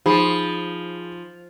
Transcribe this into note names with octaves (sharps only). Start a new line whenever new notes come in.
F3 D#4 G#4 B5